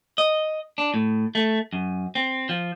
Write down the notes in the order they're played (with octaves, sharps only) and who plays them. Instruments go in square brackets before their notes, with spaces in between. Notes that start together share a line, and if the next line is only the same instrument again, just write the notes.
[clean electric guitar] D#5
D4
A2
A3
F#2
C4
F3